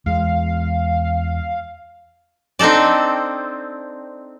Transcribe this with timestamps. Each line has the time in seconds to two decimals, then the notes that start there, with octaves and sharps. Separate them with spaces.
0.06 E2 G#3 F5
2.59 C4 D4 D#4 A4 D5